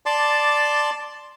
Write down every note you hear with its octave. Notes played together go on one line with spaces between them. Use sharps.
D5 A5 C6 D6